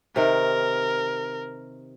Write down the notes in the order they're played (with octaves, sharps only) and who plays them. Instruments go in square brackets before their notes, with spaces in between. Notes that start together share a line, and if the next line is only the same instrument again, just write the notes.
[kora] C3 D#3 [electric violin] A#4